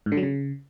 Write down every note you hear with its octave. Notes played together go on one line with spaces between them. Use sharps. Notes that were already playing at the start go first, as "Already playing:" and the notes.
G#2
D3
F#3
C#3